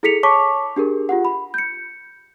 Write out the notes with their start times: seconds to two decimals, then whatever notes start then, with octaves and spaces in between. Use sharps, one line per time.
0.03 E4 G#4 A4 B6 C#7 F7
0.23 C#5 A5 C#6 D6 B6
0.76 D4 G4 G#4 A#4
1.09 F4 G4 F#5
1.25 B5
1.54 G6 C#7